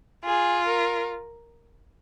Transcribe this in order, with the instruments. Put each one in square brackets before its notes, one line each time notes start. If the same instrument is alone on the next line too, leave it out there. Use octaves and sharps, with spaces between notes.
[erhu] F4 [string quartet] G#4
[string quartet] A#4